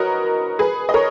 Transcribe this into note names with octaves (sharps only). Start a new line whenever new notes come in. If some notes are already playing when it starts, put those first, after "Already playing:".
Already playing: F#4 A#4 B4 C#5 D#5
G#4 B4
D#5
A#4 C#5